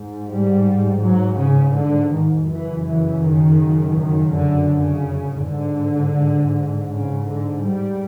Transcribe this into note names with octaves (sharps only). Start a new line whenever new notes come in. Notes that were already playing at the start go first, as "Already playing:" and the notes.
Already playing: G#2
G3
F#3
C#3
D3
D#3
F#2 C#3 E3
E3
D#3
D#3
D3
C#3
G#2 D3
C#3
D3
G3